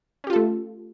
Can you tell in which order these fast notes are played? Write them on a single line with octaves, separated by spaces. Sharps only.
C#4 G4 F4 A4 A3